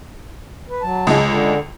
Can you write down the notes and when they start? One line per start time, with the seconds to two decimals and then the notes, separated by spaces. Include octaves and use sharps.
0.69 B4
0.82 F#3 A5
1.07 C#2 G#3
1.28 D3